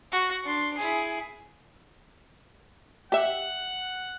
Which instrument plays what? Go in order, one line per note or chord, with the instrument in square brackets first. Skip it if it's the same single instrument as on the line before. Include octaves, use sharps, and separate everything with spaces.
[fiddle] F#4
D4 C6
E4 G#4
[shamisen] G4 E5 [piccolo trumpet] F#5